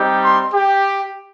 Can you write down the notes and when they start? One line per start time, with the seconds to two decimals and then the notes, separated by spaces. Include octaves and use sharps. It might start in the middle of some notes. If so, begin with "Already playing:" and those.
Already playing: G3 C4 D#4 G4
0.23 C6
0.53 G4